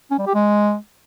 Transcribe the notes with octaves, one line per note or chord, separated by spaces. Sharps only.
C#4
G3
G4
G#3